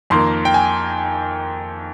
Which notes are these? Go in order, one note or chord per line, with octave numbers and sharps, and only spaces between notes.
F2 D#3 A#3 C6
G5
G#5